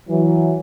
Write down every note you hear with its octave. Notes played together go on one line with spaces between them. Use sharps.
E3 F#3